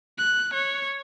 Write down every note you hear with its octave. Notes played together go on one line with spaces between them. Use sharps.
F#6
C#5